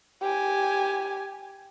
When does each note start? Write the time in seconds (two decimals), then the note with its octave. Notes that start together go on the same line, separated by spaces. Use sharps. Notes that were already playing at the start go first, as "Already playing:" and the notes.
0.22 G4 G#5